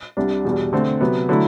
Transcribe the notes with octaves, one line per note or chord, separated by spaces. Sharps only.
C2 C3 G3 D4
E2 B2 G3
D3 A3 C4
C3 F#3 B3
D3 F#3 A3 E4